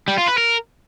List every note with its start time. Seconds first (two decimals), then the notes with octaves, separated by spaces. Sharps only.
0.08 G3
0.18 F4
0.28 B4
0.38 A#4